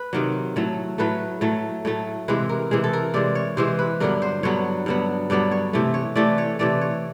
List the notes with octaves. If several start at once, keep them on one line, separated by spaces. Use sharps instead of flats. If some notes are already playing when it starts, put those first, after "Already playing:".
Already playing: B4
C3 D#3 F#3
A2 F#3 A3
A2 F#3 A3 B4
A2 F#3 A3
A2 F#3 A3
C3 E3 G#3 B4
A#4
C3 E3 G#3 G#4
A4
A#4
C3 E3 G#3 D5
C#5
C3 E3 G#3 C5
B4
G2 D3 F#3 B3 A#4
C5
G2 D3 F#3 B3 C#5
G2 D3 F#3 B3
G2 D3 F#3 B3 D5
C#5
C3 E3 A3
C#5
C3 E3 A3 D5
C#5
C3 E3 A3 D5
C#5